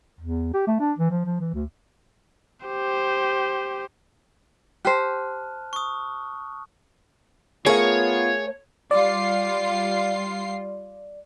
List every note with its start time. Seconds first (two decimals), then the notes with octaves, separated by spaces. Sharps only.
0.21 E2
0.54 G4
0.67 A3
0.80 D4
0.99 E3
1.10 F3
1.25 F3
1.40 E3
1.54 D2
2.66 G4 C5
4.85 G4 C5 A5 F6 F#6
5.73 C#6 D#6
7.66 A3 B3 F4 G#4 A#4 C#5 F5
8.91 G3 F4 D5 C7